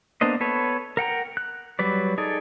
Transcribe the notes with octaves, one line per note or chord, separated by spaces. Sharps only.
A#3 B3 D4 C5 D#5
B3 A4 B4 C#5
A#4 F#5 G5 A#5
F#6
F#3 G3 B4 D5
D#4 G#4 A4 D5